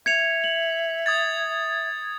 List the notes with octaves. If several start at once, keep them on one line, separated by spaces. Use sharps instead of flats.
E5 G#6 C#7 F7
F#7
D#6 G#6 A6